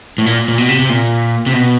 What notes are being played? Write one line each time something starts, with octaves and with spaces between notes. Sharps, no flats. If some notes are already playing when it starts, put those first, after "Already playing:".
A2
A#2
A#2
B2
C3
C3
A#2
C3
B2